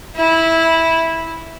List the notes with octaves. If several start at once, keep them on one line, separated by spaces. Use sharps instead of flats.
E4